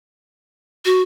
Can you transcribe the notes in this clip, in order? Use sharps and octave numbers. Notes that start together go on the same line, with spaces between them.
F#4